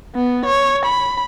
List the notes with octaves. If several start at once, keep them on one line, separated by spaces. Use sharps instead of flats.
B3
C#5
B5